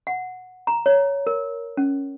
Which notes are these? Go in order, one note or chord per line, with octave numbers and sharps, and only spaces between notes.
F#5
A#5
C#5
A#4
C#4